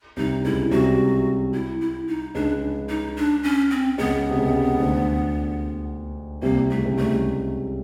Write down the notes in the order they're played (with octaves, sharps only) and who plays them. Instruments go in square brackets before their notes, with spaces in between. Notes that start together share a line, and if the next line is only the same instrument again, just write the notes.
[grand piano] C2 C3 [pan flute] D#4
[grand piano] C#2 C#3 [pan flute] E4
[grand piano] C2 C3 [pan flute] F#4
[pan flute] E4
E4
D#4
[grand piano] C#2 C#3 [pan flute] D4
[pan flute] D#4
D4
C#4
C4
[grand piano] C#2 C#3 [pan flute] B3
[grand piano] C3
C#2 C#3
D2 D3
[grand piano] C2 C3 [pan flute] A#3
[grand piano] C3 [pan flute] A3
[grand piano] C#3
C2 C3
[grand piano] C#2 C#3 [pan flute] A3